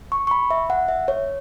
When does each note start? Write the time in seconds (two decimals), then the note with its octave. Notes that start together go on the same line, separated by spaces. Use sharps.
0.12 C#6
0.27 C#6
0.31 B5
0.50 E5
0.70 F#5
0.88 E5
1.08 C#5